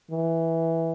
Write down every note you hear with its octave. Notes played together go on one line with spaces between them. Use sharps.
E3